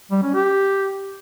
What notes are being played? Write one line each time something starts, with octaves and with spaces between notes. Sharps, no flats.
G3
C#4
G4